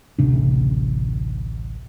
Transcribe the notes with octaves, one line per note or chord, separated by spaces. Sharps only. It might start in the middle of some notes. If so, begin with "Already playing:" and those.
A1 D2 C3 D4